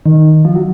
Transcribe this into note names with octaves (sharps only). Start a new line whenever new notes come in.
D#3
F3
F#3